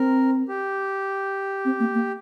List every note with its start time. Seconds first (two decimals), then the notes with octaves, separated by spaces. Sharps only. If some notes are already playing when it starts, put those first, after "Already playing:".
Already playing: C4 A#4
0.48 G4
1.65 C4
1.80 A#3
1.95 A#3